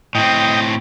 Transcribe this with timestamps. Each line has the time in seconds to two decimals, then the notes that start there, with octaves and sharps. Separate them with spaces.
0.15 A2 C4 D#5 G5